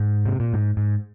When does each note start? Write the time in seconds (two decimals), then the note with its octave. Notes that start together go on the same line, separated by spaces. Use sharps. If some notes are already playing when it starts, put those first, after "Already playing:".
Already playing: G#2
0.26 C3
0.40 A#2
0.53 G#2
0.77 G#2